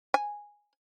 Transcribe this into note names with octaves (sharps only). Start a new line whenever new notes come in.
G#5